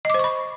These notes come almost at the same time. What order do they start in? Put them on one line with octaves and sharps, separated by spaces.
D#5 D6 C5 C#6 B5